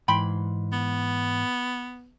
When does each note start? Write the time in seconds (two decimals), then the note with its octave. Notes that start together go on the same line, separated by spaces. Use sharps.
0.08 G#2 E3 G5 B5 C6
0.73 B3